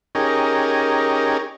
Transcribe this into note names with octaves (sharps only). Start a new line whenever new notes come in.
C#4 D#4 G4 G#4 A#4